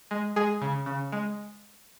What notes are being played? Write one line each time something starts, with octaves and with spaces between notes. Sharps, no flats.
G#3
G#3 G#4
C#3
C#3
G#3